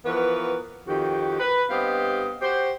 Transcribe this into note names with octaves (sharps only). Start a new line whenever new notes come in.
E3 F3 B3 F#4 A#4 B4
F2 D#3 F#4 G4
B4
G2 B3 C4 G4 D#5 F5
F#4 G4 C5